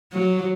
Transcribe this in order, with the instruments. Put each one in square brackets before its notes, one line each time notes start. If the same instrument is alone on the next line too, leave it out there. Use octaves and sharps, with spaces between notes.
[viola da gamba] F#3